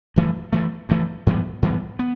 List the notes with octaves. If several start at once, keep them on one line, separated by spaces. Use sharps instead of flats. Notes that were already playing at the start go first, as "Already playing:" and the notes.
G2 E3 A3
G2 E3 A3
G2 E3 A3
G#2 E3 G3 B3
G#2 E3 G3 B3
B3